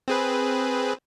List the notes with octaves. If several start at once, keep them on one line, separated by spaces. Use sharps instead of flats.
C4 G#4 B4